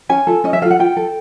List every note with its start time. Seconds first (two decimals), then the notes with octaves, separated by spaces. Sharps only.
0.09 C#4 G#5
0.27 F4 A4
0.44 C#4 D#5
0.53 E5
0.62 F4 A4 F5
0.71 F#5
0.79 F4 G5
0.97 A4